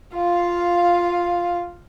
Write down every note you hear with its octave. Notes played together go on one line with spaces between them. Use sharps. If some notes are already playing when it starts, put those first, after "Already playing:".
F4 F5